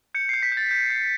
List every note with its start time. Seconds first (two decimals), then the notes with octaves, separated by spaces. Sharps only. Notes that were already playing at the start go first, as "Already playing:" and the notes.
0.14 G6 C#7
0.29 G6 C7
0.43 B6
0.52 G6
0.57 A6
0.71 G6
0.90 G6